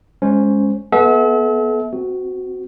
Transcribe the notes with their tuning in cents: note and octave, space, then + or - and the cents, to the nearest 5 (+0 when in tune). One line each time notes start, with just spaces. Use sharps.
G#3 +0 C#4 +0 C5 +0
B3 -10 A4 -40 E5 -30
C4 -30 F#4 +0